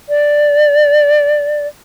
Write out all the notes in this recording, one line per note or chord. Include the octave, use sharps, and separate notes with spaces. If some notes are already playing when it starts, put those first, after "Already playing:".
D5